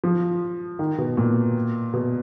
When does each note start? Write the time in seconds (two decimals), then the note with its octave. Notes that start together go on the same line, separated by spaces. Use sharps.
0.04 F3
0.79 D#3
0.98 B2
1.17 A#2
1.93 B2